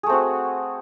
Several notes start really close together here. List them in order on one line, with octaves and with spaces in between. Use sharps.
G#4 A3 C4 F#4